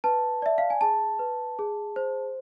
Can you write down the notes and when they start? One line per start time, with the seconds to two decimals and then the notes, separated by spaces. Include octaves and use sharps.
0.04 B4 A5
0.42 D5 E5
0.58 F5
0.70 G#5
0.81 G#4 A5
1.19 B4
1.59 G#4
1.96 C5